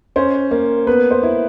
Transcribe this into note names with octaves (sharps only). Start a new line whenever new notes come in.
C#4 C5
A#3
B3 B4
C5
E4